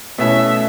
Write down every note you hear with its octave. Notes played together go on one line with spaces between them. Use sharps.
B2 A3 C#4 E4 E5